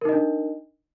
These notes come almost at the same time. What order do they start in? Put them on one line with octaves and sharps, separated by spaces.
A#4 D#4 D#5 D4